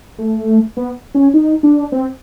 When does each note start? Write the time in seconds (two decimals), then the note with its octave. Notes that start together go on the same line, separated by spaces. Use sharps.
0.19 A3
0.77 B3
1.15 C#4
1.34 D#4
1.63 D4
1.92 C4